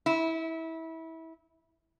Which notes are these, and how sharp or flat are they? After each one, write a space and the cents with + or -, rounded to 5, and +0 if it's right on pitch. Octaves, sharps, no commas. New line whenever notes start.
E4 -25